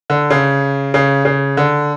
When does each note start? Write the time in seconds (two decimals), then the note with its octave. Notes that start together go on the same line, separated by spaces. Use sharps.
0.10 D3
0.30 C#3
0.94 C#3
1.25 C#3
1.57 D3